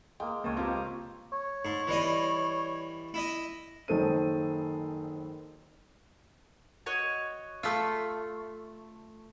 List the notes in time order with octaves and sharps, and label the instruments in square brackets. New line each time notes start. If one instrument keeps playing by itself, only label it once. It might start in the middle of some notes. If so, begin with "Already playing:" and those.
[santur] G#3 A#3 [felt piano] G5
[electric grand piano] C#2 A#3 [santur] C#5 D#5 A5
[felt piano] C4 G4 [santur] F4 A#5
[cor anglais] C#5
[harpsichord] G#2
E3 G3 D#5
E4 D#5
[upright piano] F#1 D#3 A4 C5 D#7
[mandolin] F#4 C#5 D#5
[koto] A3 F4 [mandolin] C#6 D#6 E6